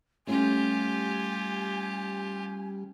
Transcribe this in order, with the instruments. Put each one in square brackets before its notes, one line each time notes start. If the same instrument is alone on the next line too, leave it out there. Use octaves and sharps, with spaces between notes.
[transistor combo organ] G3 [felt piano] A3 C#4 [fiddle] F4 G4 [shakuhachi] G#5